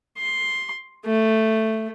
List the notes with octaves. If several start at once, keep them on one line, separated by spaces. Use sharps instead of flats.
C6
A3